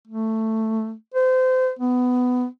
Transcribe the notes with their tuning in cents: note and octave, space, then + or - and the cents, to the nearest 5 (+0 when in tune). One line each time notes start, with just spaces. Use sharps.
A3 +10
C5 -30
B3 +15